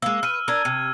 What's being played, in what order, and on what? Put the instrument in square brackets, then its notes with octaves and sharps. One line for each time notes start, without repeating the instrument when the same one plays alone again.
[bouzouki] G#3 A#3 [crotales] E6
[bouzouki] B4 [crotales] F6 D#7
[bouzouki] D4 A#4 [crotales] E6 G#6
[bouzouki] C3